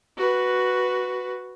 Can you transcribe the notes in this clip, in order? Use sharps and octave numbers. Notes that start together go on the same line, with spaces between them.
F#4 B4